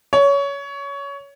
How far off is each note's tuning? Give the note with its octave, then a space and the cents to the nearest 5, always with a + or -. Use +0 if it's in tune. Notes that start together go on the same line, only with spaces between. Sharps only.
C#5 +20